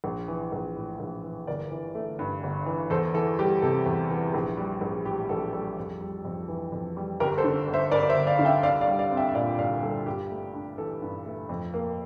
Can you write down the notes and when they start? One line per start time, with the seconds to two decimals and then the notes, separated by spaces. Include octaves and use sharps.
0.04 A#1
0.28 E3
0.52 A#1
0.76 A2
1.00 A#1
1.24 E3
1.47 G1 A#4 D5
1.71 E3
1.95 A3
2.19 G2
2.43 G1
2.66 E3
2.90 E2 A4 C5
3.14 E3 A4
3.39 G3 G4
3.62 C3 A4
3.86 E2
4.10 E3
4.34 A#1
4.57 G3
4.81 A#1
5.05 A2 G4
5.29 A#1 A4
5.53 G3 A4
5.77 F2
6.01 G3
6.25 F2
6.48 E3
6.72 F2
6.97 G3
7.20 G1 G4 A#4
7.38 A4 C5
7.44 D3
7.68 G1
7.74 C5 E5
7.91 G2 A#4 D5
8.02 D5
8.09 C5 E5
8.15 G1
8.27 D5 F5
8.39 D3 F5
8.45 E5 G5
8.63 C2 D5 F5
8.81 D5 F5
8.87 G3
8.99 D5 F5
9.11 C4
9.17 E5 G5
9.29 E5
9.34 A#2 D5 F5
9.58 C2 D5 F5
9.82 G3 A4
10.06 G2 G4
10.30 A3
10.54 D4
10.78 E3 A4
11.02 G2
11.26 A3
11.49 F2
11.74 A#3